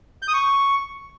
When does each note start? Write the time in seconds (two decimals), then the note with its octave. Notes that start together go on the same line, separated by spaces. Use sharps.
0.22 G6
0.28 D#6
0.33 C#6